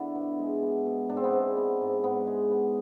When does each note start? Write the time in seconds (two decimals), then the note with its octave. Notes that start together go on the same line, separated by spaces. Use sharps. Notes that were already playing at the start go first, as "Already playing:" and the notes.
Already playing: D3 B3 D4 E4
0.15 B2
0.39 G#3
0.63 B3
0.86 B2
1.09 G#2 D4
1.17 C4
1.24 B3
1.31 G#3 C4
1.56 B3
1.80 G#2
2.03 G#2 B3
2.27 G#3
2.51 B3